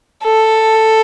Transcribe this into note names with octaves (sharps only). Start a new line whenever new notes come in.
A4